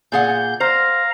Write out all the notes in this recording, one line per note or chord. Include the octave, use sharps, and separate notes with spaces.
A#2 G#4 F#5 G6
C5 F5 A#5